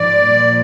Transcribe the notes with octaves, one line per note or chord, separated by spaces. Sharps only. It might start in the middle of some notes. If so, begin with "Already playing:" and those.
Already playing: G#2 F3 D5
A#2 F3